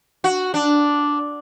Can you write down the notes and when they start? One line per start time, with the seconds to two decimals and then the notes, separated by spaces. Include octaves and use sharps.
0.24 F#4
0.54 D4